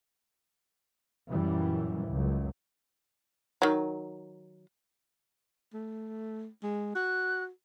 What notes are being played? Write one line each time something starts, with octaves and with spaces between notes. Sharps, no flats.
F#2 A#2 E3 G3
C#2 F#2
D#3 F#3
A3
G#3
F#4 F#6